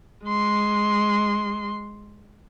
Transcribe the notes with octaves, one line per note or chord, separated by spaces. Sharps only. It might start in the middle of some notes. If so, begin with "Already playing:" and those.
G#3 C6